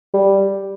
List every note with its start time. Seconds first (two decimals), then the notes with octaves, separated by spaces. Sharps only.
0.14 G3